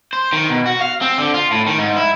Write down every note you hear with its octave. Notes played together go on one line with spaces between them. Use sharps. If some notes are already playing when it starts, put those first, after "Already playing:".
C5
D#3
B2
F#4
F5
C4
D3
F4
A2
D#3
G#2
E4